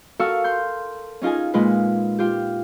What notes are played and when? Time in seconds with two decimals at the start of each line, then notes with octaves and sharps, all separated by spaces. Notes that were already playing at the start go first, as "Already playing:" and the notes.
0.19 F#4 A4 A#4 F5 C#6 E6
0.44 C6 G6
1.22 C#4 D#4 F4 G#4 G#5
1.54 A#2 G#3 F4 B4
2.19 F4 G4